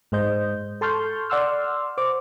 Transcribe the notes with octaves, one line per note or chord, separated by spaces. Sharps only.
G#2 G#3 C5 D#5 G6
A4 A5 C6 C#6 F6 G6
D5 F#5 C6 E6 F6
C5 D6